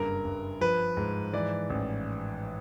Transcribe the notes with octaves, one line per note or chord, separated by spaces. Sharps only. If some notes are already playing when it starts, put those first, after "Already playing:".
Already playing: F#1 G2 A#4
G2
F3 B4
G#2
E3 D5
A1